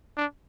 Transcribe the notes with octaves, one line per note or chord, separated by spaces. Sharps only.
D4